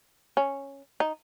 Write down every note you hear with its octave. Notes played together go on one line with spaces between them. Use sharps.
C#4
D#4